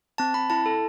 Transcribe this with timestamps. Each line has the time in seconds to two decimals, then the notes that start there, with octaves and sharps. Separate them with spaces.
0.18 C4 A5
0.34 C4 B5
0.50 E4 A5
0.66 A4